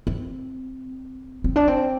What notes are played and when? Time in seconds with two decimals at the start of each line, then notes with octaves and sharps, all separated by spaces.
0.07 C4
1.44 C4
1.56 D4
1.68 C4